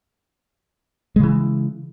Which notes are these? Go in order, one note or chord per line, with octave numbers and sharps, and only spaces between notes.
C#3 E3 G#3